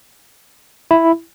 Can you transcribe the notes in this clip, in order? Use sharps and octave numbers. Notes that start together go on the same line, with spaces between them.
E4